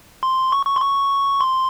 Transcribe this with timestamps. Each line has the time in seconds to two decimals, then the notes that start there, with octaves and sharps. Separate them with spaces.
0.23 C6
0.52 C#6
0.66 C#6
0.76 C6
0.81 C#6
1.41 C6